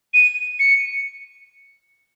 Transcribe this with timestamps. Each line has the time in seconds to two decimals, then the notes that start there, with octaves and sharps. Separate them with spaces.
0.14 D#7
0.59 C#7